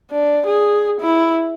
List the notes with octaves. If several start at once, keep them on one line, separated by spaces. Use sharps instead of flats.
D4
G#4
E4